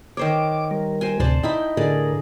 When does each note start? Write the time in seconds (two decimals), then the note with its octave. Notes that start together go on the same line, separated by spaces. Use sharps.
0.17 D#3 C5 C#5 D6
0.71 G3 A#4
1.01 C5 G5 G#5
1.20 D2 A2 C3 C5 D5 A5
1.43 D#4 E4 G5 B5
1.77 A2 D3 G#4 A#4 D5